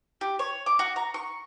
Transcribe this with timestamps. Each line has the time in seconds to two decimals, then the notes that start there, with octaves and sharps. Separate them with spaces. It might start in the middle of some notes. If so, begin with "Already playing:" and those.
0.21 G4
0.39 C#5
0.66 D6
0.79 F#4
0.96 A#5
1.14 C#6